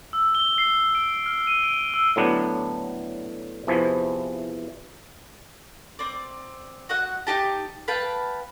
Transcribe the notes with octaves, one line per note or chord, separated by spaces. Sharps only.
E6
G7
C7
D7
F6
D#7
D7
E6
A2 D3 F#3 B3 D4
E2 C3 E3 F3
C4 D5
F#4 D#5 F#5
D#4 G4 A5
B4 F5 G5 A5